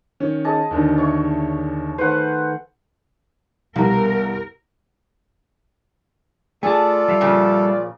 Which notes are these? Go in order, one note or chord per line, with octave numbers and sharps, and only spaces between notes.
D#3 C#4
G#4 D#5 A5
D#2 D3 D#3
C#5 E5 C#6
D#3 A3 B4 C5 F#5
C2 B2 A#4 F5 A#5
A3 F4 G#4 A4 D5 A5
G3 E5 F5
A#2 C#3 F3